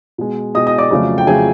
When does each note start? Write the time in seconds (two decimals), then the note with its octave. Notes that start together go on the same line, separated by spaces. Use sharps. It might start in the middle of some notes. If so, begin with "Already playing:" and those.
0.18 B2 G#3
0.55 B2 G#3 D#5 D#6
0.67 D#5 D#6
0.78 D5 D6
0.90 F2 C#3 F#3 A3
1.18 G5
1.27 F2 C#3 F#3 A3 G#4 G#5